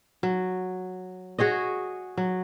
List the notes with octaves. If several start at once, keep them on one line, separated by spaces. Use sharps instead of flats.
F#3
F#4 G#4 C#5 D#5
F#3